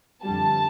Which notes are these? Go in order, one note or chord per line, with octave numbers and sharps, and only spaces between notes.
F2 D3 G3 A5